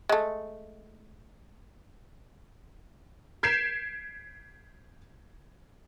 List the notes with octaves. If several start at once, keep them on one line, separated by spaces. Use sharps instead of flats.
G#3 A3
G6 G#6 B6 C7 D7 E7